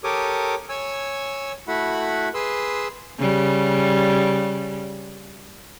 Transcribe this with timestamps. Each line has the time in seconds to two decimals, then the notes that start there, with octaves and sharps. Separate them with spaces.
0.04 G4 A4 A#4 C#5 D6 D#6
0.69 C#5 G#5 E6
1.68 A3 E4 F#4 F#5 B5
2.34 G#4 B4 C6 E6
3.19 C#3 G3